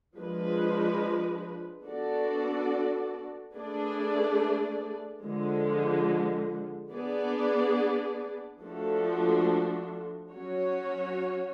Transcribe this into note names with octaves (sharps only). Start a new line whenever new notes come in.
F3 G#3 D4 G#4 B4
B3 D4 F#4 A4 D5
A3 D4 G#4 B4 D5
D3 F3 G#3
B3 D4 G#4 B4 D5
F3 A3 D4 F#4 A4
F#3 C#4 F#4 C#5